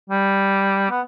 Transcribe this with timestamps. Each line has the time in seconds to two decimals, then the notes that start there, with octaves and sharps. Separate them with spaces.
0.10 G3
0.90 B3